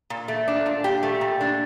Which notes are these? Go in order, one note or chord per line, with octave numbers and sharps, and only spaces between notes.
A#2
A3
D4
A#2
A#2 G4
A3
A#2
D4